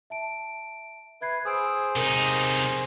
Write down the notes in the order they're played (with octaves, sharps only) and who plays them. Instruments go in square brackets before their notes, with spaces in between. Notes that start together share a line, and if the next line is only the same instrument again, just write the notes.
[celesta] E5 A5 D7
[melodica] B4 [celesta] E5 G#6 C7
[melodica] G#4 C5 [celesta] D#6 E6 D7
[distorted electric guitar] C3 D#4 [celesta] A#4